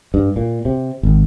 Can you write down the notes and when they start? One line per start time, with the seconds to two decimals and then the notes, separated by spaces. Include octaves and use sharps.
0.14 G2
0.36 A#2
0.65 C3
1.03 G#1